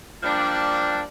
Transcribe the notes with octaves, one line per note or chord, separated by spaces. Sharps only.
F3 G3 A#3 D4